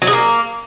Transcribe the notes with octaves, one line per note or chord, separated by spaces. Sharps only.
F#3
G#4
A#3